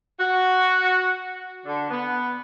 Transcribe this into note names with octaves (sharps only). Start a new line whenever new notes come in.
F#4
D3
B3